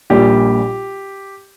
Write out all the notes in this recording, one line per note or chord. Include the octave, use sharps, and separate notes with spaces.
A#1 A#2 G3 G4